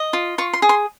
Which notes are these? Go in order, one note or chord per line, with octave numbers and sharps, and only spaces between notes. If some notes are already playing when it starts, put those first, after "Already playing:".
Already playing: D#5
F4
F4 C#6
C6
G#4
C6